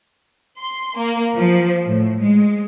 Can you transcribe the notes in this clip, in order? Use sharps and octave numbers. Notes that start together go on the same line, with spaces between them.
C6
A#3
F3
A2
G#3